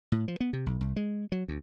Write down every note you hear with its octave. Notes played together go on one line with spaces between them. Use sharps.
A2
F3
B3
C3
B1
C2
G#3
F#3
D2